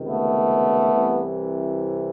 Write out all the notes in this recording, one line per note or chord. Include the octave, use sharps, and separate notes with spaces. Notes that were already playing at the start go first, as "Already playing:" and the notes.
Already playing: C#2 C3 D#3
A3 B3
C2 C3 E3